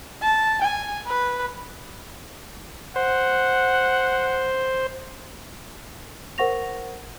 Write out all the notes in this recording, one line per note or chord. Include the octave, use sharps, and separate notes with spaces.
A5
G#5
B4
C5 F#5
A#4 C5 F#5 C#6 A#6 F7